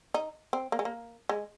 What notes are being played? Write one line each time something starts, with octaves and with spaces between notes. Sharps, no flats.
D#4
C4
A#3
G#3
A#3
G#3